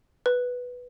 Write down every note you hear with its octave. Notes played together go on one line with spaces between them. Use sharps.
B4